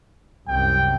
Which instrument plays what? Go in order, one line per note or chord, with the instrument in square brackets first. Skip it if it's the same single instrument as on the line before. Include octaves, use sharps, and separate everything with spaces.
[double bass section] C2 F#2 C3 [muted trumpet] G5